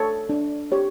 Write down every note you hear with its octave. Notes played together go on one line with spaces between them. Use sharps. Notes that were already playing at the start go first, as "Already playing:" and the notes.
Already playing: A4 C#5
D4
G4 C#5